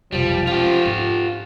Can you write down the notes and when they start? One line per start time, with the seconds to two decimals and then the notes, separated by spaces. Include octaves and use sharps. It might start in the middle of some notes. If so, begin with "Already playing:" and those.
0.12 F1 B1 F3 G3
0.47 G#3 C#4 F4 G4
0.85 G#2 D4